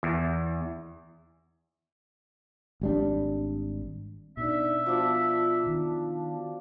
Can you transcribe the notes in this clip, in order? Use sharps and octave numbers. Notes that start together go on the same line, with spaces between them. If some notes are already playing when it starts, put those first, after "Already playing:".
E2
G#1 G3 D4
B2 D4 D#4 D5 E5
F3 B3 D4 F#4
D#3